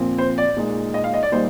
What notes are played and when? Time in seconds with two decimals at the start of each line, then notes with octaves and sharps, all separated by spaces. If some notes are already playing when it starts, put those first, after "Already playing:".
Already playing: A#2 F3 C4
0.18 C5
0.38 D5
0.56 A#2 G#3 D#4
0.94 D#5
1.04 F5
1.14 D#5
1.23 D5
1.32 A#2 G3 A#3 D#4 C5